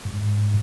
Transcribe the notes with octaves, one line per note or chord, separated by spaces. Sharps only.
G#2